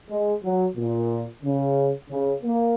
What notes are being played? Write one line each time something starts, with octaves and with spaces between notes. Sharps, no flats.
G#3
F#3
A#2
C#3
C#3
A#3